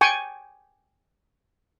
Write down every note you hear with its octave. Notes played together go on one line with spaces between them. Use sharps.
G5 G#5 C#6